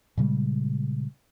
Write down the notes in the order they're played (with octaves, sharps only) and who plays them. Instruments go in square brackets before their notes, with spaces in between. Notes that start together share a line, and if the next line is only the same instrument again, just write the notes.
[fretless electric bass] A#2 C#3 G3 G#3